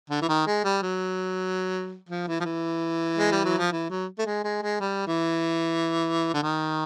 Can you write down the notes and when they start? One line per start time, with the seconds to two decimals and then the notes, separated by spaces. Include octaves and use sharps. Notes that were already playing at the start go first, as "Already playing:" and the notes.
0.10 D3
0.22 E3
0.29 D#3
0.47 G#3
0.64 G3
0.82 F#3
2.09 F3
2.28 E3
2.40 F3
2.45 E3
3.18 G#3
3.32 G3
3.45 F#3
3.58 F3
3.72 E3
3.90 F#3
4.19 A3
4.26 G#3
4.44 G#3
4.62 G#3
4.80 G3
5.07 E3
6.34 D3
6.43 D#3